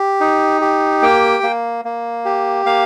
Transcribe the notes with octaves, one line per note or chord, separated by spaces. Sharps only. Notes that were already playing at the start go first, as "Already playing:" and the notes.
Already playing: G4
D#4
G4
A#3 G5
A#3
A#3
G4
A#3 F5